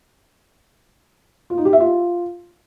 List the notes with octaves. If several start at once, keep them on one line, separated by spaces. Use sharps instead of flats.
F4
D#4
G4
E5
F4